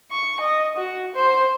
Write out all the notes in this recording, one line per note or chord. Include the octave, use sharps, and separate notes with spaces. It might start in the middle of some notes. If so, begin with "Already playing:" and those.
C#6
D#5
F#4
C5